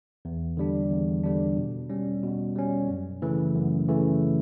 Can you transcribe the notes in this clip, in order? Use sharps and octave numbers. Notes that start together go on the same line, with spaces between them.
E2
D3 G3 D4
E2
D3 G3 D4
B2
G3 C#4
B2
G3 C#4
F#2
C#3 E3 A3
F#2
C#3 E3 A3